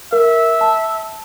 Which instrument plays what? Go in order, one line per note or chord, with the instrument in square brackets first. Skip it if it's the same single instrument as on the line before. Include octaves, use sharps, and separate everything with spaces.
[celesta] A#4 [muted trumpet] E5
[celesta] A5